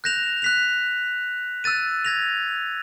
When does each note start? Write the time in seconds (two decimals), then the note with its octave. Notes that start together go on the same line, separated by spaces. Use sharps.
0.04 F#6 G6 A#6 E7 F7
0.42 F#6 B6 F7
1.64 E6 F#6 A6 D#7
2.05 G#6 A#6 F7